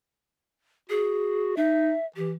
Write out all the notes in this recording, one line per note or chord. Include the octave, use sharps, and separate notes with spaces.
F#4 G#4
D#4 E5
E3 G4